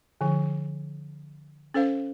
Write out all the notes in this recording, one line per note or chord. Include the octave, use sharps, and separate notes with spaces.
D3 F3
C#4 A4 C5 F5